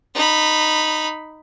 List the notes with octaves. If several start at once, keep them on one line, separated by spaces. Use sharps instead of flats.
D#4 B5